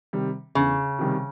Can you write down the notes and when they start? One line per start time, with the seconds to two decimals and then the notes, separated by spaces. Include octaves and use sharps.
0.13 C3 D#3 G3
0.55 E2 C#3
0.99 C3 D#3 G3